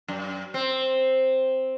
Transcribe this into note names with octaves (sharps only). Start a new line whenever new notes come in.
F#2
C4